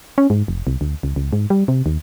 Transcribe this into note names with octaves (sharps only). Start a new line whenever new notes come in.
C#4
G#2
F1
C2
D2
C#2
C#2
G#2
G3
C3
D#2